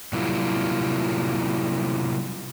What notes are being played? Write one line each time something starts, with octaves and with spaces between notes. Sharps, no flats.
C3 F#3 G3 A#3 E4 F4